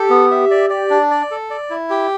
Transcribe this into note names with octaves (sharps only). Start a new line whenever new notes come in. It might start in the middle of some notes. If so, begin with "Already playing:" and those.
Already playing: G4 A4
B3
E5
D5
D5
D4
D5
A4
D5
E4
G4